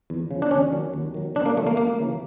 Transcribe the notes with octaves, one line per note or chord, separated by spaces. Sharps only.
E2
C#3 F3
D4
D#2 C#4
D#3 F#3
D#2
D#3 F#3
C#2 D4
A#3
C#3 E3 A3
A#3
C#2 A#3
C#3 E3